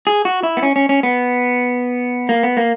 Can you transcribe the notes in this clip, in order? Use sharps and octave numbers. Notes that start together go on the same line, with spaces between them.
G#4
F#4
E4
B3
C#4
C#4
C#4
B3
A#3
B3
A#3